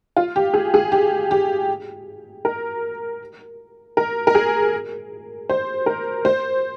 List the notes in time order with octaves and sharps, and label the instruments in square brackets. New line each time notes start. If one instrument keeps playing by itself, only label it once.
[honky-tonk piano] F4
G4
G#4
G#4
G4
G4
A#4
A#4
A#4
G#4
C5
A#4
C5